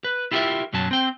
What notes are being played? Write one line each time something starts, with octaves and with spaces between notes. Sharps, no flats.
B4
E4 F4 G4 G#4 A#4 E5
B1 F#2 F#3 C#4 A5
C4 G5